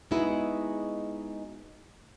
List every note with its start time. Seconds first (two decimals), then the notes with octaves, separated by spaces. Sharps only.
0.11 G#3 B3 D#4 E4 F#4 G#4